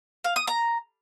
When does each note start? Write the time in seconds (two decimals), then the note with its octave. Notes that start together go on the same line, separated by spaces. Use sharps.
0.24 F5
0.36 D#6
0.47 A#5